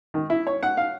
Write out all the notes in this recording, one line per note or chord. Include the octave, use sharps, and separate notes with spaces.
D#3
E4
C#5
F#5
F5